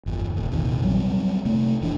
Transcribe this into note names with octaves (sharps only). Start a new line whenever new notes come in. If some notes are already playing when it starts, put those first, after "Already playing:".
G1 E2
D#1
A#1 E2 C3 D#3
F#3 G3 C4
C3 A3
E1 E3 D4